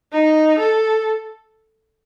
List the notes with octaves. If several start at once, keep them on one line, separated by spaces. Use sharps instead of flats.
D#4
A4